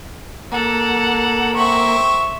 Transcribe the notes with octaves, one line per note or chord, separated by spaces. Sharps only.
A#3 A4 F#5
C4 E5 C#6